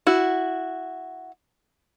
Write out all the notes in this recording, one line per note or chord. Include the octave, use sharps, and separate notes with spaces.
E4 F#4